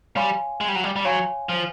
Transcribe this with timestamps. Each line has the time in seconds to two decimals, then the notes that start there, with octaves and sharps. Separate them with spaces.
0.15 G3 C#5 F5 G#5 C6
0.61 G#3
0.68 G3
0.76 F#3
0.84 G3
0.96 G3
1.05 F#3 C#5 F5 G#5 C6
1.49 F3